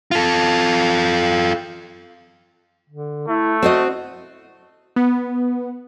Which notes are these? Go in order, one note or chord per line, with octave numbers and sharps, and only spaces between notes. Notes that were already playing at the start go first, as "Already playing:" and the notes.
F4 A4
D3
A3 E4
C4 F#4 C5 D#5
B3